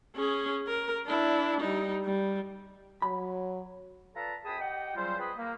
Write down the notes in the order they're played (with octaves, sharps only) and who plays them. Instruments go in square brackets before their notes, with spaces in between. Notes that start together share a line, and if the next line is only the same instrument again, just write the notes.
[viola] C#4 G#4
A#4
D4 E4
G3 D#4
G3
[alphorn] F#3 [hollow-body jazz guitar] B5
[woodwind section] F4 A4 B4 D5 A5 A#5
F#2 G#4 G5 A5 B5 D#6
G4 D#5 F#5 G5
C#3 F#3 G3 F4 C5
C4 F4 G#4 B4 D#5 B5
A#3